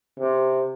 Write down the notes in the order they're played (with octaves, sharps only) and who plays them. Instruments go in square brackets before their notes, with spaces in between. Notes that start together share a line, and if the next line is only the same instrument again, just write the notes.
[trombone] C3